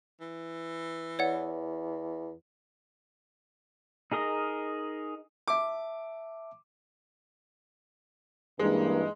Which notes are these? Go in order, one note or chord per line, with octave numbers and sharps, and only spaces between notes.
E3
E2 C#5 D5 F#5
D#4 G#4 A#4 D#5
E5 A5 D6
G2 E3 G#3 A#3 D#4